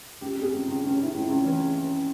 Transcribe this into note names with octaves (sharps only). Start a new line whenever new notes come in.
C#2 G4
C3
G#4
C#2
C#2
C#2 C#4
C#2 E4
C#2
C#2
E3 C#4